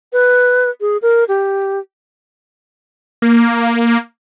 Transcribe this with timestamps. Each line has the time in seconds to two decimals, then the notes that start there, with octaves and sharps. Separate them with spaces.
0.13 B4
0.81 G#4
1.02 A#4
1.28 G4
3.22 A#3